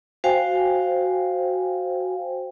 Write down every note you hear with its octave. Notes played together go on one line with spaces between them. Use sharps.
F#4 C5 F5 G5 G#5